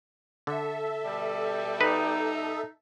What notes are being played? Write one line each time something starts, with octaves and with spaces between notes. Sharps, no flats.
D3 A4 E5
B2 G3
D#4 B4